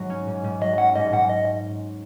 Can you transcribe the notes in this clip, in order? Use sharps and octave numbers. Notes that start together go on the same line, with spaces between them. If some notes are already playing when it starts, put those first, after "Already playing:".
Already playing: G#2 F#3
C#4
G#2
G#2
F#3 D#5
C#4 F#5
G#2 D#5
G#2 F#5
D#5